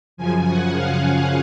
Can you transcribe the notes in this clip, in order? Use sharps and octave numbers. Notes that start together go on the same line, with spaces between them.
F#2 C#3 F3 G#5
F#5
F5